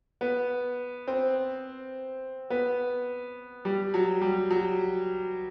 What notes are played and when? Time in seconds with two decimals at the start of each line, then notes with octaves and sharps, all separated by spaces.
0.21 B3
1.08 C4
2.50 B3
3.65 G3
3.94 F#3
4.21 G3
4.51 F#3